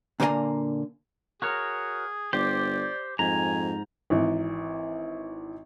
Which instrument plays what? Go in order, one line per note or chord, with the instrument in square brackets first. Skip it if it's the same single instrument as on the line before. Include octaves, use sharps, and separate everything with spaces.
[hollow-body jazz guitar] A#2 D3 A#3 A#4 G#5 A#5
[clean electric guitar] F#4 A#4 C#5 [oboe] G#4
[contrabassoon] G1 [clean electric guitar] G4 [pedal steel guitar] C5 [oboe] D5
[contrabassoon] F2 [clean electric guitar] G#2 [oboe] G#5 [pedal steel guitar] A#5
[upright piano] G#1 E3